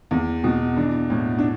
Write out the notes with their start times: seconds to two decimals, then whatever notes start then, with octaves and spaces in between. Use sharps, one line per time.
0.11 E2
0.44 B2
0.77 E3 D4
1.10 A2
1.39 D4